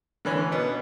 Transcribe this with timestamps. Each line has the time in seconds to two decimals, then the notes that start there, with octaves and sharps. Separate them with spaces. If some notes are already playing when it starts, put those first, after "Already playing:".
0.25 D3 E3 C#4
0.51 B2 B3